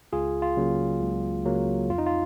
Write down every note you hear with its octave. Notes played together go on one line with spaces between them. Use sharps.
C#2 F4 G#4
F4
C#3 F#3 A#3
C#2
C#3 F#3 A#3
F2 F4
D#4
F4